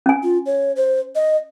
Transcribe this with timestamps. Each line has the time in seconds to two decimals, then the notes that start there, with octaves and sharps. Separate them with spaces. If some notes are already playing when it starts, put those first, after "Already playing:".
0.06 C#4 G#5
0.23 F4
0.46 C#5
0.76 C5
1.15 D#5